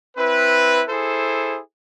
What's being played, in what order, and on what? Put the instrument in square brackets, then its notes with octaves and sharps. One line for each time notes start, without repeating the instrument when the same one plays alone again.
[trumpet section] C4 E4 B4
E4 G#4 A4 C5